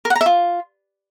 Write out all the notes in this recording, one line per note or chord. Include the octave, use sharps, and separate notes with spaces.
A#4
F#5
A#5
E5
F4